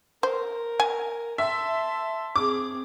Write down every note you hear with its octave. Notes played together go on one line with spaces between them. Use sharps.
A#4 C5
G#5
E5 A5 C6
C4 G#4 D6